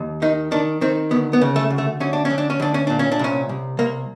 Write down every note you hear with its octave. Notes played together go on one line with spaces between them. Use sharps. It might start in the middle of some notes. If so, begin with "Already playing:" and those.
Already playing: D#2
D#3 D#4
D#3 D4
D#3 C4
D2 B3
B3
C#3
A3
D2
A3
D2 C#4
D4
C#4
D2
D4
C#4
D2 D4
C#4
A#2 D4
C#4
D4
C2 C#4
C2
C2 A#3